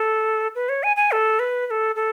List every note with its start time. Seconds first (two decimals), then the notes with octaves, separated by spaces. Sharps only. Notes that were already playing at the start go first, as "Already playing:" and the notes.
Already playing: A4
0.55 B4
0.69 C#5
0.83 G#5
0.97 G#5
1.12 A4
1.39 B4
1.67 B4
1.71 A4
1.96 A4